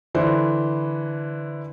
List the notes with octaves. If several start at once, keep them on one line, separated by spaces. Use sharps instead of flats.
D3 E3 E4 C5